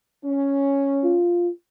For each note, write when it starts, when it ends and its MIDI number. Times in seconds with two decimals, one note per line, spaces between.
0.25 1.19 61
1.04 1.49 65